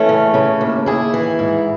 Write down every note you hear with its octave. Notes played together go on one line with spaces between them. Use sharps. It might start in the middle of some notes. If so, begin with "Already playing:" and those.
Already playing: E3 A3 C#4
C#3
C#3
D#2
D#2 E4 G#4
E3
G#2